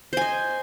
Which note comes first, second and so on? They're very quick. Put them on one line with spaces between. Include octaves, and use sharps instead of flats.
C5 G#5 D#5